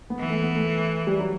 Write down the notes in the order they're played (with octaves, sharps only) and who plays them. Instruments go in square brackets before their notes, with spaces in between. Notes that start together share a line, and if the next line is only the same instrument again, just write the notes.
[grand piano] B3
[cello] E3
[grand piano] A3
B3
A3
G3
F#3